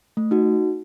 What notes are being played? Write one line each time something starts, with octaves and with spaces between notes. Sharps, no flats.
A3
D#4 F#4